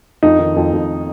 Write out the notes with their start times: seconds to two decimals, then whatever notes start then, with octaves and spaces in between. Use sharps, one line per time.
0.23 F2 D#4
0.39 D#3
0.56 F2
0.73 F2